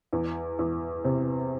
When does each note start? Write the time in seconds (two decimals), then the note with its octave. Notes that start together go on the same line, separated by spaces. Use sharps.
0.13 E2
0.59 E2
1.04 C3